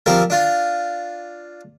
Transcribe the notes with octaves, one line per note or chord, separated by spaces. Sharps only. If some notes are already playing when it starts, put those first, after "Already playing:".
F3 G3 C4 A#4
D4 F4